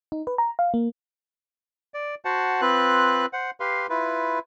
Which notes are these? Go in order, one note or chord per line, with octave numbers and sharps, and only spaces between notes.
D#4
B4
A#5
F5
A#3
D5
F#4 C5 F#5 A5
C4 F4 B4 F#6
C5 F#5
G4 B4 F5 C6
E4 F4 B4